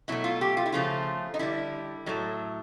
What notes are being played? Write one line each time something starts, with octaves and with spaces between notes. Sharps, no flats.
B2 F#3 A3 E4
F4
G4
F4
E4
C#3 F3 A3 F4
D#4
D3 G3 E4
A2 F#3 A3